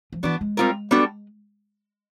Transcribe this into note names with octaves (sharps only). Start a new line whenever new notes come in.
F3
E3 B3 D4 F#4
G#3
G3 C4 F4 A#4
G3 B3 D4 F#4 A4